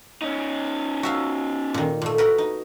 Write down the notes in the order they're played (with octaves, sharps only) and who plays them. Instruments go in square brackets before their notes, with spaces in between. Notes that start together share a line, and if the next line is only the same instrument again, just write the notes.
[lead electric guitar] C#4 D#4
[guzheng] F#4 E5 F5
A#2 D#3
A#2 A3
F#4 A#4 B4
D#4